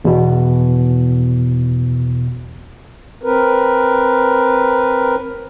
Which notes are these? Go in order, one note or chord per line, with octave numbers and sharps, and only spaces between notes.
E2 B2
C4 A#4 B4